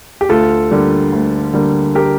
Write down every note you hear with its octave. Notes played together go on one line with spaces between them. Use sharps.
G4
D2 F4 A4
D3 G3 A#3
D2
D3 G3 A#3
G4 A#4